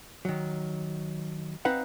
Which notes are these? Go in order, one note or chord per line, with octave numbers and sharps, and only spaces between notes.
D#3 F#3
C4 D#4 B4 F5 F#5